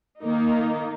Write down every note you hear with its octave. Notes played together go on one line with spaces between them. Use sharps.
D#3 A#3 D#4